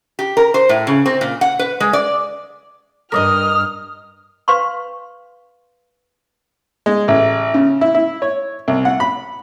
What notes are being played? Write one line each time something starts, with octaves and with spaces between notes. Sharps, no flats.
G4
A#4
C5
A2
C#3
C4
A#2
F#5
B4
G#3
D5
G2 A#4 D5 D#5 D#6 F6
B4 F5 C6 C#6
G#3
A1
C#3
E4
E4
C#5
C2
F#5
B5